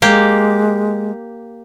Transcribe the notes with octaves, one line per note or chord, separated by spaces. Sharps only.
G#3 A#3 G4